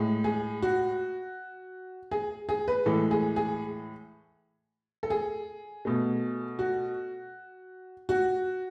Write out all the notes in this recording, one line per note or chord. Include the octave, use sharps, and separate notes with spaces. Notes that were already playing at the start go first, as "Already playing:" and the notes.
Already playing: A2 G#3
G#4
F#4
G#4
G#4
B4
A2 E3 G#3 A4
G#4
G#4
A4
G#4
B2 A3
F#4
F#4